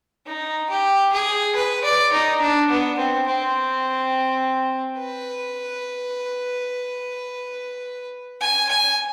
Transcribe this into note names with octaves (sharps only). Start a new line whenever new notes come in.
D#4
G4
G#4
B4
D5
D#4
D4
B3
C4
C4
B4
G#5
G#5